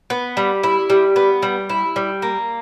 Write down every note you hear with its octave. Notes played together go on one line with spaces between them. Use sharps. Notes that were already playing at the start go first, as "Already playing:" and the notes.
B3
G3
E4
G3
B3
G3
E4
G3
A#3